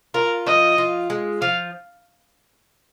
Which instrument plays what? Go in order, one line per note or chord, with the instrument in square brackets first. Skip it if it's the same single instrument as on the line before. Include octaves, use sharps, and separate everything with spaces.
[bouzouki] F4 [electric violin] A#4
[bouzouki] F3 [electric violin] D#5
[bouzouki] F4
G#3
[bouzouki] F3 [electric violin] F5